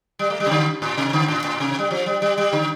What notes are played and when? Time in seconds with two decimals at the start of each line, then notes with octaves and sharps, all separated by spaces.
0.19 G3
0.30 A3
0.40 G3
0.46 C3
0.51 D3
0.82 A2
0.97 C3
1.13 D3
1.28 A2
1.44 A2
1.60 C3
1.79 G3
1.91 F3
2.06 G3
2.22 G3
2.38 G3
2.53 D3